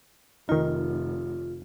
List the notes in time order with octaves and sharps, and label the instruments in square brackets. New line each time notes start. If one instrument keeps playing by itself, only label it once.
[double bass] F1 [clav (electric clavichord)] D#3 D#4 [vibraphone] F4